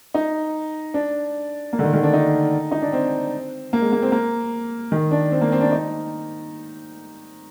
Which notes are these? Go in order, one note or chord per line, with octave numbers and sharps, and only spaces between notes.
D#4
D4
A#3
D3
D#3
D#3
D4
D#4
D#4
D4
C4
A#3
G#3
A#3
C4
A#3
D#3
D4
C4
A#3
C4
D4
D#4